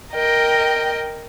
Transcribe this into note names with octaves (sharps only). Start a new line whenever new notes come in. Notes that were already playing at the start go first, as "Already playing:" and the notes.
A#4 D#5 G5